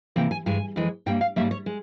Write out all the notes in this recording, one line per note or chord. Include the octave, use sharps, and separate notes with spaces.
C3 E3 A#3 G5
G#5
G2 E3 G#3 G#5
F2 E3 G#3
G2 G3 A#3 G5
F5
G#2 G3 A#3 E5
C#5
G#3